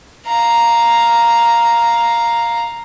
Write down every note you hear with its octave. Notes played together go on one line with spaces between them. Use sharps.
F5 A#5